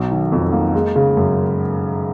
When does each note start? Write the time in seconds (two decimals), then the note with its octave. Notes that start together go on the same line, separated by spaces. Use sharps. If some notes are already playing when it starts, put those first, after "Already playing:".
Already playing: B1 F#3
0.11 D#3
0.32 F2
0.52 A#3
0.75 G#3
0.96 C#3
1.17 F#2